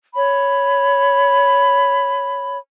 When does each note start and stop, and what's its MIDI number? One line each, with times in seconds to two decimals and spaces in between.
0.14 2.58 73
0.14 2.58 83